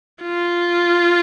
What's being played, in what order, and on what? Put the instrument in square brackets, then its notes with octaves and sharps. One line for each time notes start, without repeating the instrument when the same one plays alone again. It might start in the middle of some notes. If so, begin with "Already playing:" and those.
[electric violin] F4